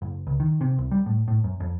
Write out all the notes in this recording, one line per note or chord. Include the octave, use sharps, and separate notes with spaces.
F#1
C#2
D#3
C3
C2
G3
A2
A2
F#2
F2